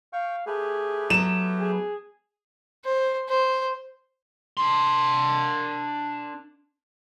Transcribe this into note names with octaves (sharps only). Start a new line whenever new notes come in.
F5 G5 C#6
A3 G4 G#4 B4
F#3 B3 E7
G#4
C5
C5
D4 C6